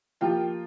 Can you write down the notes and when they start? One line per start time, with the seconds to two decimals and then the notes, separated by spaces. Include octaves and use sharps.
0.21 F3 A#3 F4 G4 G5